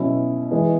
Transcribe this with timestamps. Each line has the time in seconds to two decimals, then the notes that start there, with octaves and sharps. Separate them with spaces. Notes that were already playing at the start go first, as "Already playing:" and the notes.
Already playing: B2 F#3 C#4 E4
0.51 E3 G#3 B3